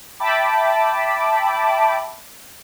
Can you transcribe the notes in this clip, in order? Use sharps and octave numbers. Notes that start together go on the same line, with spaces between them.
E5 G5 A5 B5 D6